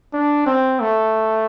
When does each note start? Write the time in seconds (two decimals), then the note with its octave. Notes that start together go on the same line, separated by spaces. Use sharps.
0.13 D4
0.47 C4
0.80 A3